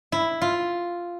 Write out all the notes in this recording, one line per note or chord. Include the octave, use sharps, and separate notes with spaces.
E4
F4